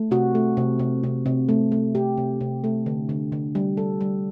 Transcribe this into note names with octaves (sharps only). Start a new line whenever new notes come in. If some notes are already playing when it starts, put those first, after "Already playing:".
Already playing: A3
C3 F#4
A3
C3
C3
C3
C3
A3
A3
C3 G4
C3
C3
A3
D3
D3
D3
G3
G3 A4
G3